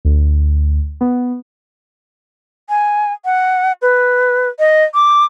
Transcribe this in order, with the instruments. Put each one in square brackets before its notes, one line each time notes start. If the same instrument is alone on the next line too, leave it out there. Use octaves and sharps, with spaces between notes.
[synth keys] D2
B3
[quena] G#5
F#5
B4
D#5
D6